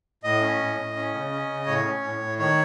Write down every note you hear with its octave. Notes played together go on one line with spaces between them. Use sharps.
A2 D#5
C#4
A2
A2
C#4
C#3
C#4
C#3
A2 C#5
C#4
A2
A2
D#3 C#5